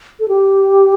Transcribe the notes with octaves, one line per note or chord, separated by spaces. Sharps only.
A4
G4